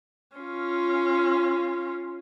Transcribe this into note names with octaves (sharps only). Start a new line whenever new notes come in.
C#4 F4